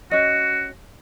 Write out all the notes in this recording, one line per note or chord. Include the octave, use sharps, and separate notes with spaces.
C#4 F#4 D#5